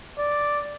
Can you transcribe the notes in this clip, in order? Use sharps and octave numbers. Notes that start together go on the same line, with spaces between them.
D5